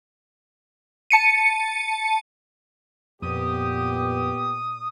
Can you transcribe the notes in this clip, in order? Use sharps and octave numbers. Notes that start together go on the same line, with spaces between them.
A5 C#7 D#7
F2 A#2 B3 G4 D#6